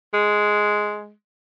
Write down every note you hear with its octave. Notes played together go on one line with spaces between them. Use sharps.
G#3